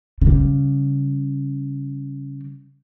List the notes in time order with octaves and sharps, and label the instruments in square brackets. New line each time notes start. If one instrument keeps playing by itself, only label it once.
[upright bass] C#3 G3